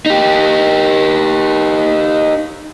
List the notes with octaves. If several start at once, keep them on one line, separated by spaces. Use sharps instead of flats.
D#4 G4